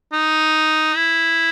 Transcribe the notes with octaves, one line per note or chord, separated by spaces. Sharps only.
D#4
E4